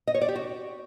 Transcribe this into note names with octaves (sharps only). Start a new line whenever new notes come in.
D#5
C#5
D5
G4
F#4